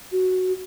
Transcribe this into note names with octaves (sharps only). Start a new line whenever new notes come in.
F#4